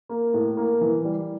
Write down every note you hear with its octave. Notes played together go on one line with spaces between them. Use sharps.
A#3
A2
A#3
E3
G3